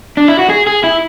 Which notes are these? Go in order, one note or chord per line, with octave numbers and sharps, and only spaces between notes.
D4
E4
F#4
G#4
G#4
E4